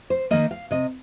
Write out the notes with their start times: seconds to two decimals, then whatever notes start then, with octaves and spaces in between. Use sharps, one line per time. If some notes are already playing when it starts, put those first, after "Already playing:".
0.10 C5
0.31 D#3 A#3 D#5
0.51 F5
0.71 C3 D#5